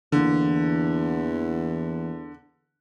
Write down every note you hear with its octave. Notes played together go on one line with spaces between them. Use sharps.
E2 D3 E3 A#3 E4